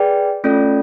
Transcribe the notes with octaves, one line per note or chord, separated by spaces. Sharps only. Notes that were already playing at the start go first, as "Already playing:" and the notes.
Already playing: G#4 B4 D5 G5
A3 C#4 F4 A4 D5